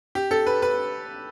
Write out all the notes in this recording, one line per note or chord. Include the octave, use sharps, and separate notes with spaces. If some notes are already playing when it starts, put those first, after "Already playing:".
G4
A4
B4
B4